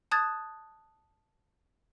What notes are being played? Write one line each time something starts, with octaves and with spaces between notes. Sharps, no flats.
A5 D#6 F#6 G#6 A6